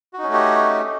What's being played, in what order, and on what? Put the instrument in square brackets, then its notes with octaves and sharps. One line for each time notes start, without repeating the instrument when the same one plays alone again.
[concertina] F#4
D#4
C#4
A3
G4